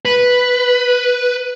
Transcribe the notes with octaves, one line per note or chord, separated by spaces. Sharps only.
B4